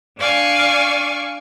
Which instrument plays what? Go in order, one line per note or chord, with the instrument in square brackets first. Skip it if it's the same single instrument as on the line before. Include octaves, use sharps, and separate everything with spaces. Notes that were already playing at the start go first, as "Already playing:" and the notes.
[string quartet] D4 D5 F5 G#5 C#6